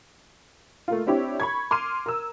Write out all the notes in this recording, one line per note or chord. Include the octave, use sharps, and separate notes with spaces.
A3 A#3 F4
C4 D4 E4 G4 C#5
B5 C#6 G#6
C6 D6 F6 D#7
A#4 E6